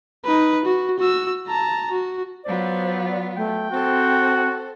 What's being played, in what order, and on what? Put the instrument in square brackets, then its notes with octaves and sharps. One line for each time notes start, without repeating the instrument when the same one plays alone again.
[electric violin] D#4 B4
F#4
F#4 E6
A5 A#5
F#4
[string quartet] F#3 B3 F4 [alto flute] C5 [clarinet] D5
[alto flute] A3 [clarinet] G5
[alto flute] C4 [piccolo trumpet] F#4 [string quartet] A4 C5